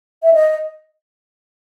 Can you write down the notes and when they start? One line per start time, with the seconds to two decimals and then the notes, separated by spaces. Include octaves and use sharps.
0.23 E5
0.33 D#5